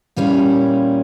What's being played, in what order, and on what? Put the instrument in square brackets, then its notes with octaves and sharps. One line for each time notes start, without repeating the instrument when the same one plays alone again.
[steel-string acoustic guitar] A#2 G3 A#3 C#4 E4